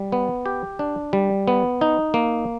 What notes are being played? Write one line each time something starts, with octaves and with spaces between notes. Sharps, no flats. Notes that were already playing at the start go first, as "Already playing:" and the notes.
Already playing: G3
B3
G4
D4
G3
B3
D#4
A#3